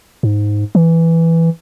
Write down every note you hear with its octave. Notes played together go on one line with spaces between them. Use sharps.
G#2
E3